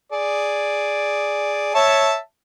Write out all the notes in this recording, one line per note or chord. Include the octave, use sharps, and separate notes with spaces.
G#4 D5
C#5 E5 A5